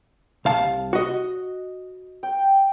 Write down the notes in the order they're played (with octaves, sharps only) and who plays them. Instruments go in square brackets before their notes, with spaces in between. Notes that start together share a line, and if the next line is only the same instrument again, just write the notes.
[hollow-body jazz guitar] C2 F5 A5
F#4 D#5
[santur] G5